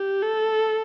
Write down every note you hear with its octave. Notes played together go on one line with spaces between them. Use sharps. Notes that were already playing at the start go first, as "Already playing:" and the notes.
Already playing: G4
A4